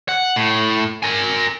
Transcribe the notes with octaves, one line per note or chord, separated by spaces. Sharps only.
F#5
A2
A#4 G#5